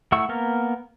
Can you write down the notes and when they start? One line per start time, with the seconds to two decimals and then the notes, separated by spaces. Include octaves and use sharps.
0.12 A3 E4 F#5 C#6 E6
0.29 A#3 B3 A#4